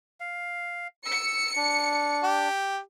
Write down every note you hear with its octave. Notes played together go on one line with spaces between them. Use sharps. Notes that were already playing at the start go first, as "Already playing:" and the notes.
F5
E6 C#7
D4
G4